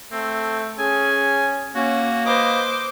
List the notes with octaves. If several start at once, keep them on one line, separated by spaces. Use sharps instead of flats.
A3 C4
C#4 G#4 G#5
A#3 C#4 F#4
B4 C5 D#5 D6